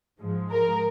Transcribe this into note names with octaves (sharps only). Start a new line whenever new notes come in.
G#2 F3 G#3
A#4